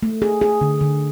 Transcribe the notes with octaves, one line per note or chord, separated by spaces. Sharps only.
A3
G#4
G#4
D3
D3